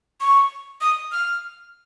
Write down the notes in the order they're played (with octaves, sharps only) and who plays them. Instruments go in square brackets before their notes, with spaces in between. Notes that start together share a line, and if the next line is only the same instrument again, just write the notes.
[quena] C#6
D#6
F6